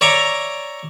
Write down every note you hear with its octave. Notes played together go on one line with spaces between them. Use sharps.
C#5 D5 E5 A#5 C#6 D6